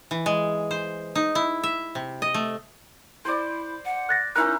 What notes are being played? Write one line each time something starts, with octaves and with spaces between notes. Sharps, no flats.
E3
G#3
C5
D#4
E4
E5
C3
D#5
A3
E4 C5 D5
F#5
F#6 A6 A#6
C#4 D#4 E4 A#4 F#6